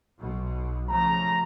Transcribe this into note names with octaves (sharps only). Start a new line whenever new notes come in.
B1 B2
C#3 F3 A3 A#5